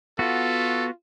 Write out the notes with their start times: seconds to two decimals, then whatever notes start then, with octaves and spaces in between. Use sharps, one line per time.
0.19 B3 F4 F#4 A4